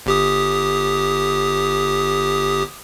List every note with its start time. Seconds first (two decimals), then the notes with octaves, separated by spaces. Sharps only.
0.06 G1 G4 D#6